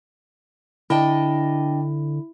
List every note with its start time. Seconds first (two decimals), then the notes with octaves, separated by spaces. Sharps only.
0.90 D3 D4 E4 D#5 G5